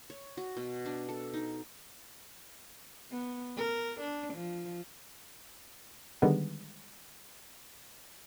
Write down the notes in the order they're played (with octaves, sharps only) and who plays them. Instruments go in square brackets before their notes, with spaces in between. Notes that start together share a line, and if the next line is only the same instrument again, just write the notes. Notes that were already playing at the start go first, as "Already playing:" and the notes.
[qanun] C#5
F#4
B2
D4
A4
D#4
[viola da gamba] B3
A#4
D4
F3
[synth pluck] D3 D#3 G3 G#3 B3